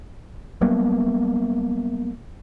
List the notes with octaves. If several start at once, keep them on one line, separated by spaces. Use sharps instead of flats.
F#3 G3 A#3 B3